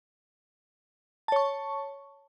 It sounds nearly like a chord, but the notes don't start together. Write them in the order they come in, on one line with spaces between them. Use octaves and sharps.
A5 C#5 C#6